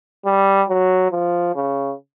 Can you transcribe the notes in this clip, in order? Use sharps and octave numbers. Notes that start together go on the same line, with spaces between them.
G3
F#3
F3
C#3